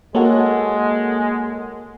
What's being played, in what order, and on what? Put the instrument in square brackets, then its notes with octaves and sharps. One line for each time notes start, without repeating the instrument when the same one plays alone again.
[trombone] G#3 [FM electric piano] A#3 [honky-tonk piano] F#4 A4 C#5